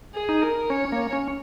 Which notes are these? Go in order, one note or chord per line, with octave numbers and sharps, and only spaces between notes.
G#4
D#4
A#4
C#4 C#5
A#3
C#4